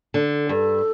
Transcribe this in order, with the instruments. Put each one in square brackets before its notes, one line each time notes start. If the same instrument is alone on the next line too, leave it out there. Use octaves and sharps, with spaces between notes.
[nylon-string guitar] D3
[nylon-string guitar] G2 [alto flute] A4